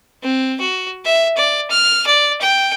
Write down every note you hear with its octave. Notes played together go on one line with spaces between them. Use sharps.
C4
F#4
E5
D5
F6
D5
G5